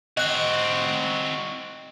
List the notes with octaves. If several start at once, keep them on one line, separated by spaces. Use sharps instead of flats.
C4 F#4 D#5 F#6